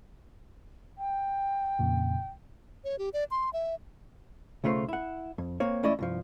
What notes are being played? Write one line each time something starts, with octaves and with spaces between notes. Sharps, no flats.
G5
F2 A#2 C#3
C#5
G4
D5
C6
E5
B1 C#3 A3 F4 C5
E4 F#5
F2
A#3 C4 C#5
E2 A3 C#4 E4 D5 D#5
C2 G2 F3